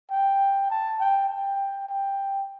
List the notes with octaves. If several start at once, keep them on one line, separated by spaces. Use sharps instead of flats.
G5
A5
G5
G5
G5